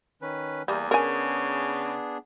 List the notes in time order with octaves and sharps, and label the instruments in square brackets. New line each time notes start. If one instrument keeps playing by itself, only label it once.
[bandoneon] D#3 C#4 B4
[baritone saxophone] E2 [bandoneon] E3 A#3 [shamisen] G3
[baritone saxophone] C#3 [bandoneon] B3 D4 G#4 [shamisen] A#4 G#5